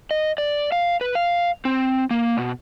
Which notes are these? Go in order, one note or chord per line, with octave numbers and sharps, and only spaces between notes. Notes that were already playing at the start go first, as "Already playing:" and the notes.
D#5
D5
F5
B4
F5
C4
A#3
B2